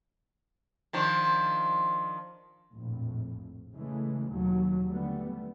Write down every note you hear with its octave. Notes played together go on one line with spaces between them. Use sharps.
D#3 F3 D4
A#1 F2 A2
C#3 E3 G#3 A3
D#2 B2 F#3
D3 G3 A3 B3